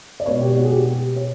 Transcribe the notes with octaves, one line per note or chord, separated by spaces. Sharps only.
D5
B2 G#3 B3 C#5
G4
F#4
G#4
G4
G4
C#5